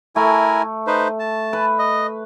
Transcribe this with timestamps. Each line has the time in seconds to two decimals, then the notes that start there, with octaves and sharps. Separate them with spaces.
0.16 A3 E4 A#4 G#5
0.87 D#4 B4 C5
1.19 A5
1.53 B4
1.79 D#5